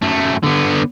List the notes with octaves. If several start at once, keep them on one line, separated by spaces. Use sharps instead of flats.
F#2 A3
D3 B3